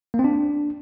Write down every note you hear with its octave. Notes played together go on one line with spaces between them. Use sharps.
A#3
C4
D4